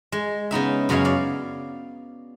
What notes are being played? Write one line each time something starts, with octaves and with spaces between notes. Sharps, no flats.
G#3
C#3 B3 D#4 E5
F#2 C#3 F#3 C#5 F5
D5 F5